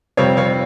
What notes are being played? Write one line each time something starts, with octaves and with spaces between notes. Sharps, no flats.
F2 C3 G3 C4 C#5 F5
C#5 F5